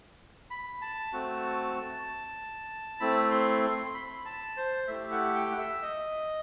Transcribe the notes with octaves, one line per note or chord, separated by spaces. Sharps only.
B5
A5
A3 C4 F#4
A3 C4 E4 B5
C6
C6
C6
B5
A5
C5
A3 E4 G4 E5
F#5
G5
F#5
E5
D#5